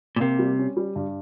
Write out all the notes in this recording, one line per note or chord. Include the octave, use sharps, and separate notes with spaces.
A#2
C3 A#3
G3
C#4
G3
G2